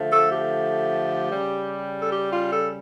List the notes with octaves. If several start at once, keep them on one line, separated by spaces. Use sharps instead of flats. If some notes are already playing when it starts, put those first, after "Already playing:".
Already playing: D3 F3 A3
A4
G4
C#3 G3
A4
G4
F4
A4